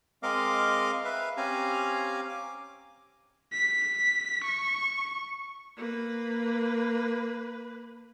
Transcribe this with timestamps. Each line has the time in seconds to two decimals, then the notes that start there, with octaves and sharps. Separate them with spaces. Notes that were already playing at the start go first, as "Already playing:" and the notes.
0.23 G#3 C4 A#4 D#5 F5 D6
1.05 B4 E5 F5
1.37 C4 C#4 G4 F5 G#5 A#5
2.29 D6
3.53 B6
4.44 C#6
5.77 A#3 B4